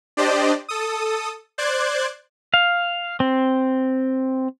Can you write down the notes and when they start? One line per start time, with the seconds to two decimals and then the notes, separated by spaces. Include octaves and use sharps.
0.17 D4 G4 C5 D5 D#5
0.69 A4 D#6
1.58 C5 D5 F#6 G#6
2.54 F5
3.20 C4